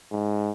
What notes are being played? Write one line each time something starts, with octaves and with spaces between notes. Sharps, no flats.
G#2